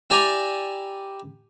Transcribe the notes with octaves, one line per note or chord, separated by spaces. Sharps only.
E4 G4 D5 G#5 A#5